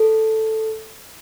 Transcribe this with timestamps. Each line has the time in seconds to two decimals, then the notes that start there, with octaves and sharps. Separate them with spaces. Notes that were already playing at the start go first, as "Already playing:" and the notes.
Already playing: A4